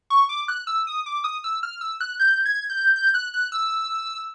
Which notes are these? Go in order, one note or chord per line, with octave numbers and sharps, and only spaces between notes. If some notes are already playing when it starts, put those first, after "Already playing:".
C#6
D6
F#6
E6
D#6
D6
D#6
E6
F6
E6
F#6
G6
G#6
G6
G6
F#6
F#6
E6